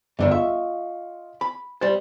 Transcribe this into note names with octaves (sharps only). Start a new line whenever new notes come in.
G1 E2 G2 D3 D#3
F4 D#5 E5 C#6
B5
G3 C5 A6